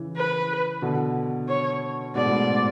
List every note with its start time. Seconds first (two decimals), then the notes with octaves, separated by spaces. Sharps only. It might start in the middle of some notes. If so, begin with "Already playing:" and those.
Already playing: C#3 E3
0.16 B4
0.82 B2 D3
1.48 C#5
2.15 G#2 B2 D5
2.26 A2
2.32 G#2